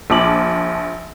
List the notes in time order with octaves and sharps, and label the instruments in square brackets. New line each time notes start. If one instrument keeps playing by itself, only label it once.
[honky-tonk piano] A#1 F3 D6 F#7